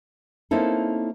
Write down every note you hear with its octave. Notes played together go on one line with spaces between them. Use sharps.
A#3 C4 C#4 D#4 E4 A4